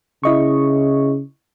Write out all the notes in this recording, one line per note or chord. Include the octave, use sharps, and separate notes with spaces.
C#3 E4 D#5 C#6